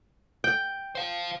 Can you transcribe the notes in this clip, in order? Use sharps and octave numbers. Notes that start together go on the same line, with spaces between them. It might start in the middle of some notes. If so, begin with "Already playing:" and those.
G5
C5 F5